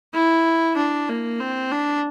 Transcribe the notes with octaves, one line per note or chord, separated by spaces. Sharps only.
E4
D4
A#3
C4
D4